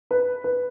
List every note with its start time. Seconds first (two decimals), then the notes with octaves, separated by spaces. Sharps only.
0.11 B4
0.44 B4